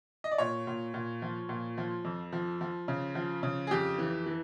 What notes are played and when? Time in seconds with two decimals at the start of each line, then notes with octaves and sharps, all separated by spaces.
0.24 D#5
0.32 D5
0.38 A#2 C#5
0.67 A#2
0.94 A#2
1.22 F3
1.49 A#2
1.78 F3
2.05 F2
2.33 F3
2.61 F3
2.88 C#3
3.15 F3
3.43 C#3
3.67 G#4
3.71 F2 G4
3.99 E3
4.26 E3